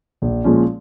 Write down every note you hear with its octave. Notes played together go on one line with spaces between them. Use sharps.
A#1
A#2 F3 G#3 C#4